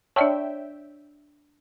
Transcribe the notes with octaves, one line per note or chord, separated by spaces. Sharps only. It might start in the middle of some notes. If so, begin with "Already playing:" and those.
D4 C#5 D5 E5 G5 A5